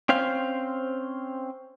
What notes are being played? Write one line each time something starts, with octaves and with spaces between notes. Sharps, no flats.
C4 C#4 C5 F5